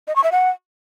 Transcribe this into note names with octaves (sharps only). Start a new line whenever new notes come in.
D#5
C#6
E5
F#5